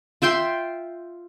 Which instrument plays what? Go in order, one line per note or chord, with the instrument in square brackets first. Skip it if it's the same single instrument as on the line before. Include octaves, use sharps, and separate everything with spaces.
[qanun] F4 E5 G5 C6